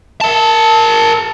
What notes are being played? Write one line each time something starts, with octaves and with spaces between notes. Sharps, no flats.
A#4 A5